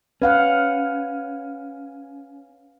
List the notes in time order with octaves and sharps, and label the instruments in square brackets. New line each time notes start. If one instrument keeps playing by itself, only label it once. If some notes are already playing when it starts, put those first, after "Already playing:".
[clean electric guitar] C#4 [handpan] B4 F5 F#5